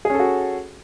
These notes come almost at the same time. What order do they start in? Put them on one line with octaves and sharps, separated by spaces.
G#4 C#4 A4 F#4